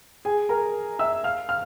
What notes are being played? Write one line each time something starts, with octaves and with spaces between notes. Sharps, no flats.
G#4 G#5
A#4 A#5
E5 E6
F5 F6
F5 F6